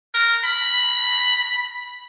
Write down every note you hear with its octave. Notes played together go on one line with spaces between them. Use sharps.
A#4
B5